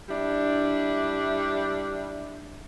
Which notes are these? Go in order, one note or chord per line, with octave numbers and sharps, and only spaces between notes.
G3 D4 E4